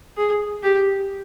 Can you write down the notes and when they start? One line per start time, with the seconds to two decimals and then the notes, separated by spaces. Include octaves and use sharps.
0.17 G#4
0.63 G4